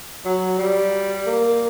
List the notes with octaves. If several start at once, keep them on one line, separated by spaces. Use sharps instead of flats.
F#3
G3
A#3